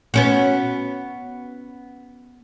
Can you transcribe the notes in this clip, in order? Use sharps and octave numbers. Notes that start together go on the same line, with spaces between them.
B3 C#4 F#4